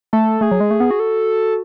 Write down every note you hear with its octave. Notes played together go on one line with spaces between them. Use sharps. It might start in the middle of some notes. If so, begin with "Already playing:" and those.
A3 A4
A3 G#4
F#3
G#3
A3
B3
F#4
A4